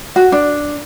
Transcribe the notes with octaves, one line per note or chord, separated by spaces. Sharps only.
F#4
D4